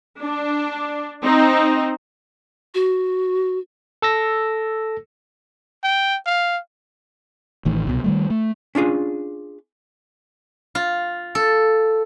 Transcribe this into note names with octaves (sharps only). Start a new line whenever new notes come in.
D4
C4 D#4
F#4
A4 E6 A#6
G5
F5
A1 A2 D#3
C2 B2
D#3 G3 A3
A3
C#4 D4 F4 G#4
F4
A4